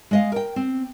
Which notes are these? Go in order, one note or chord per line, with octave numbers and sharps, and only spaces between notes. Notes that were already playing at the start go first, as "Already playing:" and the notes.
G#3 D#5 F5
A#4 G5
C4